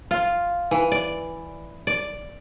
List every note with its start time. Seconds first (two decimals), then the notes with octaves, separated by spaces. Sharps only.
0.11 F4
0.71 E3
0.92 D5
1.87 D5